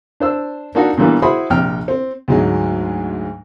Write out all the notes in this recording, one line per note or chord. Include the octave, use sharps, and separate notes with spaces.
D4 C5 E6
A#3 D4 D#4 F#4 A4
A#2 D3 E3 G3 A#3 B3
E4 F#4 G#4 C5 B5 C6
A#1 C3 G5 F6
C4
D2 G#2 F#3 G#3